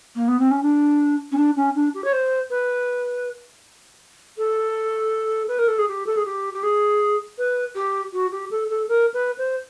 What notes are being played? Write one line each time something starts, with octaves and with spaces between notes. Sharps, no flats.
A#3
B3
C4
C#4
D4
C#4
D4
C#4
D4
G4
C#5
C5
B4
A4
B4
A#4
A4
G#4
G4
A4
G#4
G4
G4
G#4
B4
G4
F#4
G4
A4
A4
A#4
B4
C5